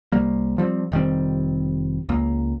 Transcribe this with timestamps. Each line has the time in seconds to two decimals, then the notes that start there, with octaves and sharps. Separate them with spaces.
0.12 C2 G3 A#3
0.58 F3 G3 B3 C4
0.92 F1 D#3 G3 C4
2.09 C#2 A#3